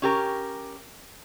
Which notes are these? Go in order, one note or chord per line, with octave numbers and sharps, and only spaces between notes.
C#4 G4 A#4